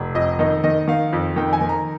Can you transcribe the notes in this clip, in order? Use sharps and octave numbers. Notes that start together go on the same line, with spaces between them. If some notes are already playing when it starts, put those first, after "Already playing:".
Already playing: F1
F2 D#5
D#3 D#5
D#3 D#5
D#3 F5
F2
D#3 G5
G#5
D#3
A#5